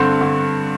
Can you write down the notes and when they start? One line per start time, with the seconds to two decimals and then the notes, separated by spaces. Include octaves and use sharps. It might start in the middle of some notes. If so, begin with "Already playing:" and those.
Already playing: G2 D3 C4
0.21 D3